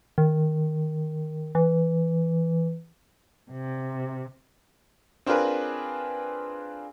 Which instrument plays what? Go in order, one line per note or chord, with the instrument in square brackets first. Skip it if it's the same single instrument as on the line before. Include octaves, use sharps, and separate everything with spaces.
[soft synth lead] D#3
E3
[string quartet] C3
[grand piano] C4 D4 F4 G#4 A#4 B4